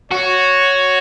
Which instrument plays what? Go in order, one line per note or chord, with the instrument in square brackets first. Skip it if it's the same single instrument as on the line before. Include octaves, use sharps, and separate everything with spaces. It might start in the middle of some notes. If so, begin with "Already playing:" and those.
[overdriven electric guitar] F#4 [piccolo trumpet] C#5